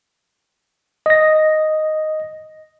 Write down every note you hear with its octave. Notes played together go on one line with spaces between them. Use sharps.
D#5 A#6